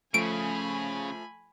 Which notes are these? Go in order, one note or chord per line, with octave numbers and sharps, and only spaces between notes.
C#3 F3 A3 G#5 B5 D7